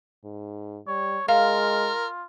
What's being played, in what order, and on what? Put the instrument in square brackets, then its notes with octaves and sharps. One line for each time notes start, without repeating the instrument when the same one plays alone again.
[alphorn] G#2
[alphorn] G3 [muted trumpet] C#5
[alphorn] G#3 [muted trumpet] F4 [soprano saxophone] A#4 [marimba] F5